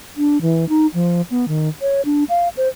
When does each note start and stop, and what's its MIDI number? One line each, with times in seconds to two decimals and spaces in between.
0.17 0.41 62
0.41 0.68 52
0.69 0.87 63
0.94 1.22 53
1.31 1.45 59
1.48 1.69 51
1.81 2.05 73
2.05 2.24 62
2.29 2.49 77
2.57 2.68 72